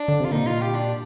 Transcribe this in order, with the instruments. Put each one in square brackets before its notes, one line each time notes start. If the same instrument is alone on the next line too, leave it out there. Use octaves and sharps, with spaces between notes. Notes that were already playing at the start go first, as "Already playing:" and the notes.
Already playing: [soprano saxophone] D4
[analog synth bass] D3
[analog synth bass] C3 [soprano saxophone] F4
[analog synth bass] A#2 [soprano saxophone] D#4
[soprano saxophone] F4
G4
D4